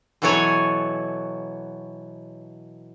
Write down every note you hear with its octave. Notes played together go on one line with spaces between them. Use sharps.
B2 E3 F#3 A4 C#5 G#5